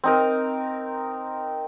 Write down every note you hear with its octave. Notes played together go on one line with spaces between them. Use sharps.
C4 D#4 A#4